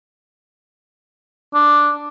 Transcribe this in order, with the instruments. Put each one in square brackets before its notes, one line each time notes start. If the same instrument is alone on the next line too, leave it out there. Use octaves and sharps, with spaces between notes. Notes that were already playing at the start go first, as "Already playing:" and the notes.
[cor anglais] D4